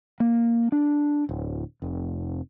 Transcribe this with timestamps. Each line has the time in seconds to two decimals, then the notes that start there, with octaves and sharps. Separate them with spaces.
0.20 A#3
0.72 D4
1.29 D1
1.82 F1